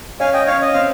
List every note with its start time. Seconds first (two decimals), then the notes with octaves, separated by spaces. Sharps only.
0.20 C#4 F5 G#5
0.33 D#5 G5
0.47 C#4 C#5 F5
0.61 D#5
0.73 C4 F5